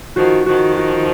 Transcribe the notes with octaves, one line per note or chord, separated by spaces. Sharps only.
D#3 F3 F#4
D#3 F3 F#4
F#4